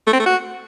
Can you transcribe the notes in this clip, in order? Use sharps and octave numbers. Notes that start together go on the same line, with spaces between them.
A3
C4
A3
F#4